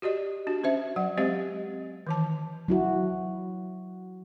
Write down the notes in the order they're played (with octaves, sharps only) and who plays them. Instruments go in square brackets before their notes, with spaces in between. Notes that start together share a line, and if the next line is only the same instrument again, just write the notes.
[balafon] F#4 G4 D5 D#5
D4 F#4
C#4 C5 E5
F#3 F#5
G#3 C4 G4 C5 D#5 F5
D#3 E3 A5
[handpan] F#3 E4 F#4